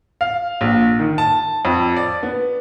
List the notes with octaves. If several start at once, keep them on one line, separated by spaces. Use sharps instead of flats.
F5
A#1
D#3
A5
F2
D5
B3